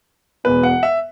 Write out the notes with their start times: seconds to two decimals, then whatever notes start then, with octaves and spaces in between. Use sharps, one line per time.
0.44 E1 E2 B2 B4
0.63 F#5
0.83 E5